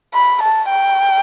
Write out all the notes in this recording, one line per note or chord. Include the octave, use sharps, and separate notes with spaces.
B5
A5
G5